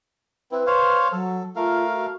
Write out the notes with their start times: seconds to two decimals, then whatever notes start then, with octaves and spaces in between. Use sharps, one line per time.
0.52 C4 E4 B4
0.66 C5 C#5 F5
1.12 F#3 A4
1.56 A3 F4 A#4 F5
1.93 F#4